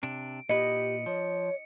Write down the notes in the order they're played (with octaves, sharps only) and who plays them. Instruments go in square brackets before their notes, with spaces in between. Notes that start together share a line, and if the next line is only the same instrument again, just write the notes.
[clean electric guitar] C3 D4 [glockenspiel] D7
[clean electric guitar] A#2 E4 B4 [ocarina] G4 [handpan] D#5 [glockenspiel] C#7
[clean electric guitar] F3 [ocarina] C#5